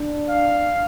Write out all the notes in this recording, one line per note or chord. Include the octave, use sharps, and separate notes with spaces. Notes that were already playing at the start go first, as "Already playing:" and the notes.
Already playing: D4
F5